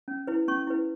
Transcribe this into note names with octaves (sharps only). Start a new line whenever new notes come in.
C#4
E4 B4
C#4 C#6
E4 B4